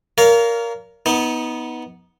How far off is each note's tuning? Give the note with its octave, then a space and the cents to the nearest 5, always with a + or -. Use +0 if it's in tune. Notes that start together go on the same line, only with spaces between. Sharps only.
A#4 +0 C#5 +45 F5 -5
B3 +0 D#4 +25